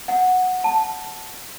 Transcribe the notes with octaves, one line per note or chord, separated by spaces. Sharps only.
F#5
A5